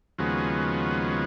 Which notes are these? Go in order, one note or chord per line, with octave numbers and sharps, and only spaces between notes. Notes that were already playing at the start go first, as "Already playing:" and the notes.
D#2 C#3 F3 G#3 B3 F#4